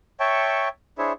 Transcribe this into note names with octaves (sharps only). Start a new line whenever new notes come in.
C#5 E5 G5 A5 C#6
D4 E4 G#4 C5 C#5 E5